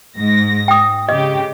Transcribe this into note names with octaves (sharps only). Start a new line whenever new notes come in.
G#2 A#6
G5 D#6
C#3 G4 D#5